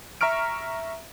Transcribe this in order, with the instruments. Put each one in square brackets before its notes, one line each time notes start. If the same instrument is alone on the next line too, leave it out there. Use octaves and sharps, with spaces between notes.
[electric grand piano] E5 A#5 C#6 F6 D7